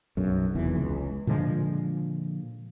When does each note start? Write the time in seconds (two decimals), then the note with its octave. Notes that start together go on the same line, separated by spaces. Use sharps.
0.17 B1 F#2
0.55 F1 E2 E3
0.76 C#2
1.27 A#2 D3 F3 G#3